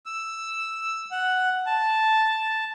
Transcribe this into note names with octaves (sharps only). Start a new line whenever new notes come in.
E6
F#5
A5